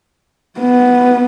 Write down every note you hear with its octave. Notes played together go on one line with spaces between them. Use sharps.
B3